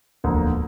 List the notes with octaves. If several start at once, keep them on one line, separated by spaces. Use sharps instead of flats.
E1 D2 D3 F3 A#3